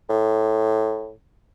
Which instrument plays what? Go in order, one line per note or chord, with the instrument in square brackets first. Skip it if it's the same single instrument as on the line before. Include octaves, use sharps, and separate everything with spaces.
[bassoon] A2